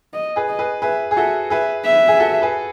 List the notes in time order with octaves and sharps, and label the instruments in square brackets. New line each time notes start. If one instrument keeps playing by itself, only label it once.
[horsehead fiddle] D#5
[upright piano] G#4 B4
[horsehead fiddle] D#5
[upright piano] G#4 B4
[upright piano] G#4 B4 [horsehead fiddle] E5
[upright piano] G#4
[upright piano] F#4 A4 [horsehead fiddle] E5
[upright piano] G#4 B4 [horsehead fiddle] E5
[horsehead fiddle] E5
[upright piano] G#4
F#4 A4
G#4 B4